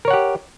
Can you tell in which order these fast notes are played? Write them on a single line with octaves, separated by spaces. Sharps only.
A#4 C#5 F#5 G4